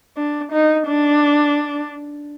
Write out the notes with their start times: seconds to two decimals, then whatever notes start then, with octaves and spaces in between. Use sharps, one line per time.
0.17 D4
0.52 D#4
0.87 D4